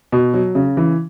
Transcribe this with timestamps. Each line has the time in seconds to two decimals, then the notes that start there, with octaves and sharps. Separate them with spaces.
0.12 B2
0.34 F#3
0.55 C#3
0.77 E3